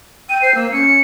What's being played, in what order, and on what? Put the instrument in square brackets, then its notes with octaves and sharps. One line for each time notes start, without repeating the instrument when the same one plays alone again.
[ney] G5 [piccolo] D#7
[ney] C5 [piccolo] C7
[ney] A#3 [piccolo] E6
[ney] C#4 [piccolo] C#7